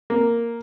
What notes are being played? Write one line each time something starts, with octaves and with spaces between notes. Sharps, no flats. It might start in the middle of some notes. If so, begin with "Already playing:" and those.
A#3